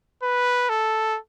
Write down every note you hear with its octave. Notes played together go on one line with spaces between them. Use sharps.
B4
A4